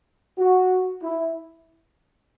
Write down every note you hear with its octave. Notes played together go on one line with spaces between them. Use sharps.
F#4
E4